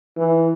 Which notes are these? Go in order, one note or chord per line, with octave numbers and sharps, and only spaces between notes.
E3